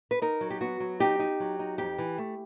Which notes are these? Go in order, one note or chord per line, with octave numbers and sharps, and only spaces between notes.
B4
D#4 A#4
F#3
G4
B3 F#4
F#3
D#4 G4
D#4
F#3
D#4
F2 G4
E3
A3